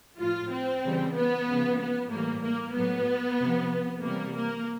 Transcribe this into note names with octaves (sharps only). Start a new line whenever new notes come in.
A2 F3 F4
C4
C#3 E3 G3
B3
C#3 F3
B3
A2 E3 G3 A#3
A#3
A2 F#3 B3
C3 F3
C3 E3 G3 A#3
A#3